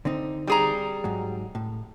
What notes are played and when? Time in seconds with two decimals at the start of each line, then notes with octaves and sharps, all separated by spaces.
0.05 D3 C4 D#4
0.47 G3 G#4 A#5
1.04 G#2 F#3
1.55 A2